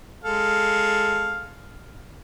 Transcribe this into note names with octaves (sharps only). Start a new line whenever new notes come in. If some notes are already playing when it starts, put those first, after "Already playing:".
G#3 A4 F5